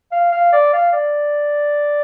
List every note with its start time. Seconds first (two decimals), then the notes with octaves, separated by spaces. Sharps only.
0.12 F5
0.32 F5
0.53 D5
0.73 F5
0.93 D5